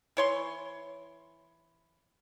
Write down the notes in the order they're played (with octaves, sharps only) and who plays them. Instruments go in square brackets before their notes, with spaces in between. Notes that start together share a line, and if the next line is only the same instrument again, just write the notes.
[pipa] E3 C#5 C6